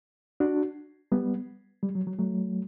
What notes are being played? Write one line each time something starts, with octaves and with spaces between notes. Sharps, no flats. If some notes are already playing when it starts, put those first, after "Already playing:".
D4 F#4
G3 B3
G3
F#3
F#3
F#3 A3